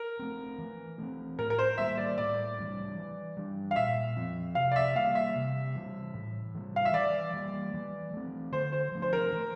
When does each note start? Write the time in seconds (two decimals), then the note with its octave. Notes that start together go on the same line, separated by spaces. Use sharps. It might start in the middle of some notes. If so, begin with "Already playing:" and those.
Already playing: A#4
0.19 A3 C4
0.58 E3
0.98 A3 C4
1.38 A2 A#4
1.50 A#4
1.59 C5
1.78 G3 A#3 E5
1.97 D5
2.18 A2 D5
2.58 E3 G3 D4
2.97 E3
3.37 G3 D4
3.71 F5
3.76 A#2 E5
4.17 F3 C4
4.55 C3 F5
4.72 D5
4.76 E5
4.95 G3 A#3 F5
5.15 E5
5.36 C3
5.75 E3 G3
6.14 A2
6.54 E3 G3
6.76 F5
6.85 E5
6.94 E3 D5
7.33 G3 A#3
7.74 E3
8.13 A3 C4
8.52 D3 C5
8.73 C5
8.92 F3 A3 D4
9.02 C5
9.13 A#4
9.32 E3